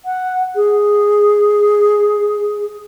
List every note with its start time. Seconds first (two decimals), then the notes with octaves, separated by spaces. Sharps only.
0.05 F#5
0.55 G#4